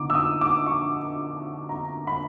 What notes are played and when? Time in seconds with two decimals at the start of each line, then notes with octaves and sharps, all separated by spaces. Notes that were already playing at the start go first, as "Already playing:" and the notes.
Already playing: D3 B3 D#4 D6
0.10 E6
0.15 D#6
0.41 D6
0.66 C#6
1.69 A#5
2.07 B5